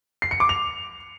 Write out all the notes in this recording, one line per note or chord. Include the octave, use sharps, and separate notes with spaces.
C7
C#7
D6
F7